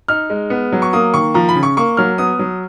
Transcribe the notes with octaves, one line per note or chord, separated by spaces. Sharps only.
D#4 F6
G#3
B3
F#3
C#6
A#3 D#6
D#3 C#6
F3 A#5
B5
C#3
C#6
A#3 C#6
F#3 F6
B3 D#6
F#3